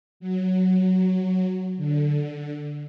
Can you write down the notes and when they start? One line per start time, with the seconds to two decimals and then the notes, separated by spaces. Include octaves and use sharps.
0.20 F#3
1.77 D3